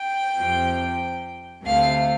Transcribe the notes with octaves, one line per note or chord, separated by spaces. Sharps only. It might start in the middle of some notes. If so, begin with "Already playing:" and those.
Already playing: G5
F2 C3 F3
D2 C3 A3 F5